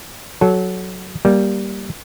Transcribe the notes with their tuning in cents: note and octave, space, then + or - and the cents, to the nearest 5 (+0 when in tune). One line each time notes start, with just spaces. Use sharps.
F#3 +0 A4 -20
G3 +0 A#3 +10